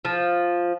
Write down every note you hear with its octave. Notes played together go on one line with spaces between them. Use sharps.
F3